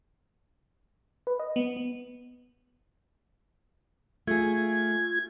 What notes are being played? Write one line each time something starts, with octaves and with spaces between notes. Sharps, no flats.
B4
D#5
B3
B3
A3 F4 G#4 G#6